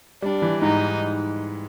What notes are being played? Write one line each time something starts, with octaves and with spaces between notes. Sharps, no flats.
G3 D4
E3
G#2 D#4